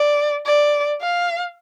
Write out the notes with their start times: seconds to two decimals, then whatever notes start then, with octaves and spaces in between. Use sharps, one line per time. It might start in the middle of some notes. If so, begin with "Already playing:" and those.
Already playing: D5
0.46 D5
1.01 F5